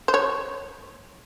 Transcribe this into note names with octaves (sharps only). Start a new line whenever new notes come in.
C5
C#5